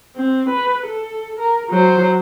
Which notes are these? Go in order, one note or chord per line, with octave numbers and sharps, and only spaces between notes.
C4
B4
A4
A#4
F#3 C5